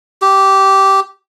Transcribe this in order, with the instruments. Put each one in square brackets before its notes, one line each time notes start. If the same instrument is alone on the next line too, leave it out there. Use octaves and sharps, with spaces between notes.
[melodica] G4